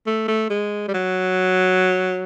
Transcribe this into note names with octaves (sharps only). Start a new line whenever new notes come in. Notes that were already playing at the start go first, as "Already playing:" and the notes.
A3
A3
G#3
G3
F#3